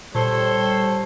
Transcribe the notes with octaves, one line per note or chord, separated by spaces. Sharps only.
A#2 G3 A4 C5 C#5 A5